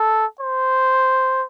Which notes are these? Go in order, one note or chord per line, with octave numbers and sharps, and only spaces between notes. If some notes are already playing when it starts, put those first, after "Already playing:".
Already playing: A4
C5